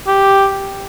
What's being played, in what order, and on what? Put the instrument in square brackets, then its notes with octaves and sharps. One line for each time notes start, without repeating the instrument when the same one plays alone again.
[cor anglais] G4